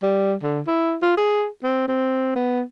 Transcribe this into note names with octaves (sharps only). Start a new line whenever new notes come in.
G3
D3
E4
F4
G#4
C4
C4
B3